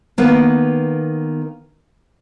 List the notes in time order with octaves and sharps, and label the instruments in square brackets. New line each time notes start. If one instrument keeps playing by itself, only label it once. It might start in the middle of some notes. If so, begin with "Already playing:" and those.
[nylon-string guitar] D#3 A#3 B3